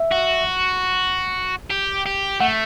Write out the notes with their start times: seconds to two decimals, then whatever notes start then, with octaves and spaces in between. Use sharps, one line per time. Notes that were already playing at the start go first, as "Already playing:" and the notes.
Already playing: E5
0.11 F#4
1.70 G4
2.06 G4
2.41 A3 F#5